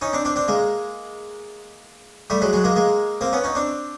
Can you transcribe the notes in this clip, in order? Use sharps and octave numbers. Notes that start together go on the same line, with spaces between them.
C#4 D#4
C4 D4
C4 D4
C4 D4
G#3 A#3
G3 A3
F#3 G#3
F#3 G#3
G#3 A#3
G#3 A#3
A#3 C4
B3 C#4
C#4 D#4
C4 D4